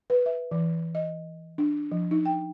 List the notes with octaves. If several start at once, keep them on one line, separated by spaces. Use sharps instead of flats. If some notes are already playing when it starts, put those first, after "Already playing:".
B4
E5
E3
D#5
D4
F3
D#4
G5